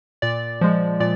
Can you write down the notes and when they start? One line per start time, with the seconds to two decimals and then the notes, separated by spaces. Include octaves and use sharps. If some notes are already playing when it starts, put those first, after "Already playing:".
0.22 A#2 D5
0.61 F3 G#3
1.00 A#2 D5